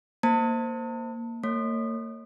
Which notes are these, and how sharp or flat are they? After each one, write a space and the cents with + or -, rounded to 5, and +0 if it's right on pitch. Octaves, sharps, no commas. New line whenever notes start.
A#3 +0 C5 +0 A5 +40
A#3 -40 C#5 +0